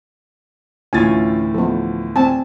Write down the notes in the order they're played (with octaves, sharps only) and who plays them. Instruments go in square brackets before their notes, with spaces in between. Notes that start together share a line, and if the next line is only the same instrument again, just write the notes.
[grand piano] D2 A2 E3 [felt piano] C#4 F4 A6 [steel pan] G#5
[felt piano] F3 [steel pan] B3 A4
[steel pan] C4 A5 [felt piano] G#5